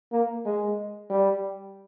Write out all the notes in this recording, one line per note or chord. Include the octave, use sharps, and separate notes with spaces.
A#3
G#3
G3